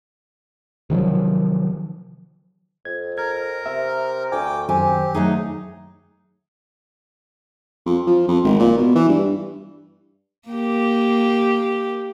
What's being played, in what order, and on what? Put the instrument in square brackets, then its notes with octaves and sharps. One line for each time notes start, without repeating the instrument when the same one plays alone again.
[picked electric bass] C3 D#3 F3 F#3
[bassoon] F2 [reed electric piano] G#6
[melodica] A#4 [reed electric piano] G#6
[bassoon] C3 [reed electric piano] E5
[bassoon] D2 [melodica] G5 D6 [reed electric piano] G#5
[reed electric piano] F#2 D#3 [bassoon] C4 [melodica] G4 [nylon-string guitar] G#5
[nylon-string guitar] F#3 A3 D#4 [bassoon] G#4
[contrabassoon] F2
F3
F2
G#1
A#2
B2
E3
G2
[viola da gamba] A#3 G4